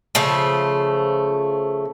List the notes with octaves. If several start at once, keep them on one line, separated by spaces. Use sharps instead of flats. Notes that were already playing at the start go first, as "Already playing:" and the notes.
C#3 F3 A3